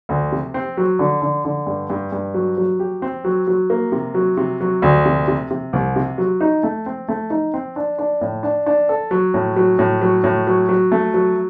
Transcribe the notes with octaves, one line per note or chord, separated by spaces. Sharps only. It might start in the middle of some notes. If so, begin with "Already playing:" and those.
D2
C3
C4
F#3
D3
D3
D3
G2
G2
G2
F#3
F#3
G4
C4
F#3
F#3
A#3
C3
F#3
C3
F#3
D2
C3
C3
C3
C2
C3
F#3
D#4
A3
C4
A3
D#4
C4
D4
D4
A2
D4
D4
A4
F#3
A2
F#3
A2
F#3
A2
F#3
F#3
A3
F#3